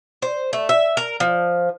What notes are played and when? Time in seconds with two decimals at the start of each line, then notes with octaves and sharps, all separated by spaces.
0.22 C5
0.53 A3
0.69 E5
0.97 A#4
1.20 F3